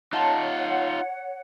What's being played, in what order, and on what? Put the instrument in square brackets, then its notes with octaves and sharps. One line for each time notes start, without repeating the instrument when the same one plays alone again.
[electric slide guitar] D#4 F4 [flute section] C#5 F#5 [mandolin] A5 C6